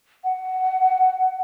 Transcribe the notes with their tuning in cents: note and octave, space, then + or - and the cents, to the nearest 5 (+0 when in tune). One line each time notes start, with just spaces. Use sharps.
F#5 +10